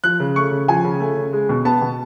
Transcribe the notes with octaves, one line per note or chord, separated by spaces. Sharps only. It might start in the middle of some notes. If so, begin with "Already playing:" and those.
F3 F#6
C#3
A3 C#6
C#3
F3 G#5
C#3
A3
C#3
G#3
B2
B3 A5
B2